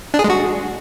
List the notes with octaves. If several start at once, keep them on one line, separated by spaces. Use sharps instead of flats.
D4
G#4
G#3
F#4